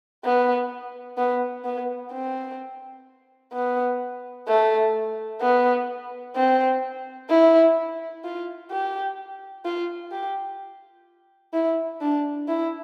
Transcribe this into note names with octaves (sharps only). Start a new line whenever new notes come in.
B3
B3
B3
C4
B3
A3
B3
C4
E4
F4
G4
F4
G4
E4
D4
E4